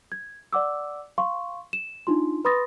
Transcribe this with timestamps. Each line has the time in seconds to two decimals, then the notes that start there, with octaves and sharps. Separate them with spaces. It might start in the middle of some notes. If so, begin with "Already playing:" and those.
0.12 G#6
0.53 D5 F#5 D6 E6
1.18 F5 C6 C#6
1.73 E7
2.07 D4 D#4 F4 C6
2.45 B4 B5 C6 D#6 A6 A#6